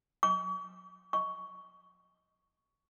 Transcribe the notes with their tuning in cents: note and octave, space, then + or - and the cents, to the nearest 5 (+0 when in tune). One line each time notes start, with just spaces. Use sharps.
C#6 +45
C#6 +15